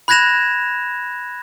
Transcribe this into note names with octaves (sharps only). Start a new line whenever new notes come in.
B5 F#6 G#6 A#6 E7 F7